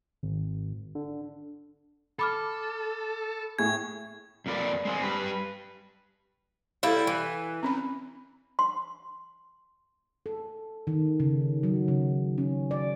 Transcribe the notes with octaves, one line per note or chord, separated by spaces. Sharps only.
G#1
D3
A4 B5 D6 F6
A2 G#4 G#6
F2 A#3 B4 D5
G#3 C4 G#4
G3 B4
G3 E4 A4 F5
E3
C4 C#4 B5
C6
A4
D#3
C#3
F#3
C#3
C#4
D5